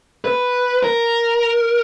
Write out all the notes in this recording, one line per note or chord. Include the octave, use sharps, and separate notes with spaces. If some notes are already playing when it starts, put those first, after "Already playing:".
B4
A#4